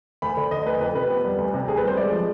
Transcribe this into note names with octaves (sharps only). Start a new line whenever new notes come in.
D2 B5
D3
D3 D#5
D2 B4
F2 B4
C3 B4
B3
G3
D2
C3
D2 G#4
B4
G3 C5
G#3 D5
F3